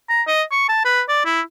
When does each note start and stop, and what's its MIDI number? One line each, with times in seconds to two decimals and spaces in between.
0.10 0.22 82
0.27 0.42 75
0.52 0.66 85
0.69 0.84 81
0.85 1.01 71
1.09 1.25 74
1.25 1.41 64